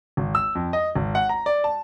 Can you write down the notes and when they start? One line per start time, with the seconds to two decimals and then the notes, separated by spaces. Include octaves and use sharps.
0.17 G#1
0.35 E6
0.55 F2
0.73 D#5
0.96 G#1
1.15 F#5
1.29 A#5
1.46 D5
1.64 A5